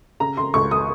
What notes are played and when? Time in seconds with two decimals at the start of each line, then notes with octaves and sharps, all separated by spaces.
0.20 C#3 A#5
0.37 C#3 C6
0.54 C#2 C#6
0.71 D#6